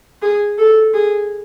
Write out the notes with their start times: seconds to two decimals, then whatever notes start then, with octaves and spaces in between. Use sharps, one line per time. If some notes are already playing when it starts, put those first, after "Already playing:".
0.22 G#4
0.58 A4
0.94 G#4